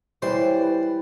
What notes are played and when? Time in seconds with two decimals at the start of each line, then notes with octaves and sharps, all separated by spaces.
0.22 E3 G3 C5 C#5
0.55 B4